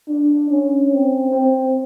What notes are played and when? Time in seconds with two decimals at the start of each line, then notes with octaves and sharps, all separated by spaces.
0.08 D4
0.50 C#4
0.92 C4
1.32 C4